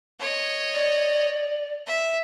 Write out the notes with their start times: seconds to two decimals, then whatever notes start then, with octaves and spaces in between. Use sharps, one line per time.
0.20 C#5 D#5
0.74 D5
1.87 E5